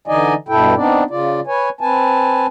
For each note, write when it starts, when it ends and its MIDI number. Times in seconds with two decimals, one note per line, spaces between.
0.08 0.34 50
0.08 0.34 52
0.08 0.34 63
0.08 0.34 74
0.08 0.34 75
0.08 0.34 80
0.49 0.75 43
0.49 0.75 47
0.49 0.75 64
0.49 0.75 69
0.49 0.75 79
0.76 1.03 59
0.76 1.03 60
0.76 1.03 62
0.76 1.03 63
0.76 1.03 74
1.10 1.40 49
1.10 1.40 65
1.10 1.40 74
1.47 1.69 71
1.47 1.69 73
1.47 1.69 80
1.81 2.46 60
1.81 2.46 71
1.81 2.46 80
1.81 2.46 81